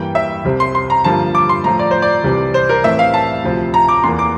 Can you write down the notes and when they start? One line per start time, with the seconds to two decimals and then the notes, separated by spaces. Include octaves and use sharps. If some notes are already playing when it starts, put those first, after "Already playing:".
Already playing: G2 E3 A#3 G5
0.15 E5
0.45 C2 C3 G3 C4
0.60 C6
0.75 C6
0.90 A#5
1.04 G2 D3 F3 A#3 A5
1.35 D6
1.49 C6
1.64 A2 F3 A3 A#5
1.79 D5
1.91 C5
2.02 D5
2.24 C2 C3 E3 G3 C4
2.54 C5
2.69 A#4
2.84 A2 E3 A3 C4 E5
2.99 F5
3.14 A5
3.44 D2 C3 F3 C4
3.74 A#5
3.88 D6
4.03 E2 E3 A#3 C6
4.19 D6